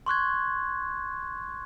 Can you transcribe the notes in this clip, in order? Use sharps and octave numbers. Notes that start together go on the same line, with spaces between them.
C6 C#6 F#6 G#6